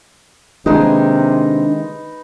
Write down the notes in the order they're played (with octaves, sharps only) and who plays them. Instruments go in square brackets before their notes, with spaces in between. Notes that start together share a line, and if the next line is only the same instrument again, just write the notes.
[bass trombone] C3 [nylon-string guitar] D#3 G#3 A#3 [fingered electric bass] D4 [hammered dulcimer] D#4 B4